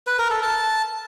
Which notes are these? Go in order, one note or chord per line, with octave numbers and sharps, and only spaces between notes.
B4
A#4
A4
A5